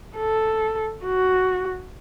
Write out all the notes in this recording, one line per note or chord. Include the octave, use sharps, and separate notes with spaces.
A4
F#4